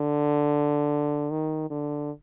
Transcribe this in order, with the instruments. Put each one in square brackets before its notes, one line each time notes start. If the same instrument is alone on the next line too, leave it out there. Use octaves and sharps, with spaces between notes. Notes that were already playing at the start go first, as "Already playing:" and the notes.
Already playing: [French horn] D3
D#3
D3